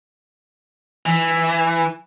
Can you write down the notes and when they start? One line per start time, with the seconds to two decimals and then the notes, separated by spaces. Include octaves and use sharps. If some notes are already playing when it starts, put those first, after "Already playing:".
1.06 E3